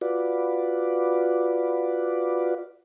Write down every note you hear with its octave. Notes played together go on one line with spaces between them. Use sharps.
F4 F#4 B4 D5